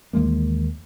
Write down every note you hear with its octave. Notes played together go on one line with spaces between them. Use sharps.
D#2 E3 G#3 A#3